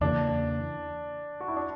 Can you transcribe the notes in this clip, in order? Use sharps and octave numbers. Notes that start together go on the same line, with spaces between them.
E2 C#3 E3 A#3 D4
F#4
E4
D4